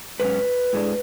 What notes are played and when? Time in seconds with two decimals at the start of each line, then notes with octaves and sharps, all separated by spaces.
0.20 G#2 F#3 C#4 B4
0.73 A2 G#3 D4